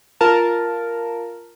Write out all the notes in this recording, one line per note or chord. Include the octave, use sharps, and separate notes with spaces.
F4 A#4 A5